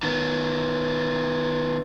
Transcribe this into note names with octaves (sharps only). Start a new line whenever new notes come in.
D#3 B3